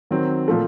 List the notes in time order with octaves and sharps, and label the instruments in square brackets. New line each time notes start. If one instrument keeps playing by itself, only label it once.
[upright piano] D#3 F#3 C4
A#2 F3 A3